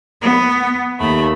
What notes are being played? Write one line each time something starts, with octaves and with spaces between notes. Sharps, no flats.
B3
D#2 A3 B5